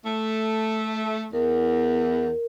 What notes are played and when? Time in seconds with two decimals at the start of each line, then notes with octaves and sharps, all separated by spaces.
0.04 A3
1.33 E2 A#4